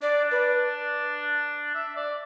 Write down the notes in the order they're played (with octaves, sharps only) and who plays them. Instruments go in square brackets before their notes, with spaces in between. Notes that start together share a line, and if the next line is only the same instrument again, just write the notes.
[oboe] D4 [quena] D5
[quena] B4
[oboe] E5
D5